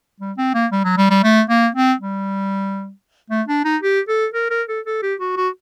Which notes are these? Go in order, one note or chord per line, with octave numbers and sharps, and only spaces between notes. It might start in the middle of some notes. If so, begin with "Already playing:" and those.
G3
C4
A#3
G3
F#3
G3
G3
A3
A#3
C4
G3
A3
D4
D#4
G4
A4
A#4
A#4
A4
A4
G4
F#4
F#4